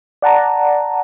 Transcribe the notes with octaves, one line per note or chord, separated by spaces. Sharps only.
D5 F#5 A5 A#5